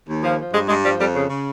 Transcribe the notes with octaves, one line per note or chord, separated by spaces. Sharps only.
D#2
F3
F3
G2 G#3
G2 G#3
F3 G3
F2 G3
C#3
C#3